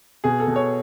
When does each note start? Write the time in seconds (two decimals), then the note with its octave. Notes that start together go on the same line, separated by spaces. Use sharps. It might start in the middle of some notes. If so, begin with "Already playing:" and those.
0.24 B2 G#4
0.40 A4
0.47 B2
0.56 C#5